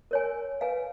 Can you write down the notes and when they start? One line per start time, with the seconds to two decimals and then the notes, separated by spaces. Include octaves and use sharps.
0.11 A#4 C#5 G#5
0.61 B4 F5 G#5